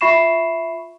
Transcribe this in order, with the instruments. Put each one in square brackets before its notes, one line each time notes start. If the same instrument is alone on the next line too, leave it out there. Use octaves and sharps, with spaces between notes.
[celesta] F4 E5 B5 C#6 C7 E7